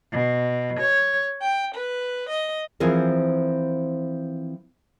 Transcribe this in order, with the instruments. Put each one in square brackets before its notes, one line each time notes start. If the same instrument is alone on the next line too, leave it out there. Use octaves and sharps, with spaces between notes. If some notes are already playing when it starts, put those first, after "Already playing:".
[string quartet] B2
C#5
G5
B4
D#5
[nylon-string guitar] E3 F3 C4 G#4 A#4